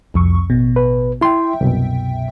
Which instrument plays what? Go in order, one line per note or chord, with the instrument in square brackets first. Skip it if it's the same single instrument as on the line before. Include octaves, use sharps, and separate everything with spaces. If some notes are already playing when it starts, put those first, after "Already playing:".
[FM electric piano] C2 F2 C#6
A1 B2
[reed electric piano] B4
[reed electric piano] E4 C6 [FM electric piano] E5 G5
[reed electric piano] C2 F#2 B2